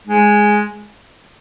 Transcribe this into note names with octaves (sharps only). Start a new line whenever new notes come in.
G#3